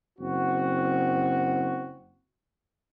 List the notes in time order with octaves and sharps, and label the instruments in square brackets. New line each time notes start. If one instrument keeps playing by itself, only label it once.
[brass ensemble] F#1 C4 F#4